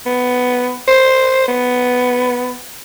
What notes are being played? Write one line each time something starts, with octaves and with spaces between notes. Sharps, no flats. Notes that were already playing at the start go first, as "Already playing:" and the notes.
B3
C5
B3